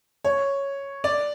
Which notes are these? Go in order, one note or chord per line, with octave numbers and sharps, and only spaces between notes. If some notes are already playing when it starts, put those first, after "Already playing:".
C#5
D5